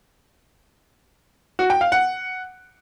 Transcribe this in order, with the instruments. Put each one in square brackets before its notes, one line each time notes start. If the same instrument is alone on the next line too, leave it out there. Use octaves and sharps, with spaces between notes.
[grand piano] F#4
G5
F5
F#5